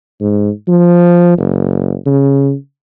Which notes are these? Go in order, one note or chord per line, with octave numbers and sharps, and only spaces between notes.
G#2
F3
F#1
C#3